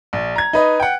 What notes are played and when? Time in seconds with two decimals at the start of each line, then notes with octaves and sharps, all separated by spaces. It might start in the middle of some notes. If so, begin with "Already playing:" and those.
0.13 A#1
0.36 A#5 G#6
0.53 D#4 B4 D#5
0.80 F#5 G5